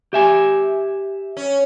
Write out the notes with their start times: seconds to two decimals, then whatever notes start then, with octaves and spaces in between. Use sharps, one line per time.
0.13 G4 E5 G#5
1.37 C#4